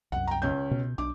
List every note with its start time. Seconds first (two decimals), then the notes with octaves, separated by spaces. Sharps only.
0.12 C2 F#2 F#5
0.27 G5 A#5
0.42 C#2 C#4 G6
0.71 B2
0.98 B1 D4 D6